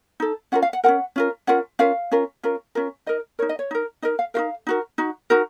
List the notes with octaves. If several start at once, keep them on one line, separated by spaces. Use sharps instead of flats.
D#4 A4
C#4 F4 A#4 F#5
F5
F#5
C#4 F4 A#4 F#5
C#4 F4 A#4
C#4 F4 A#4 F#5
C#4 F4 A#4 F5
C#4 F4 A#4
C#4 F4 A#4
C#4 F4 A#4
D#4 A#4 D#5
D#4 A#4 C#5
D#5
C#5
D#4 A#4
D#4 A#4 D#5
F5
D#4 F#4 A#4 F5
D#4 F#4 A#4
D#4 F#4
D#4 F#4 A#4